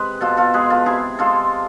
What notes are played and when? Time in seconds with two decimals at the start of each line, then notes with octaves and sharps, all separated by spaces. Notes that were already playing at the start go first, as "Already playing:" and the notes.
Already playing: C3 G#3 B4
0.21 B2 F4 A4
0.37 F4 A4
0.54 G#3 G#4 B4
0.70 F4 A4
0.86 C3 E4 G#4
1.19 G#3 F4 A4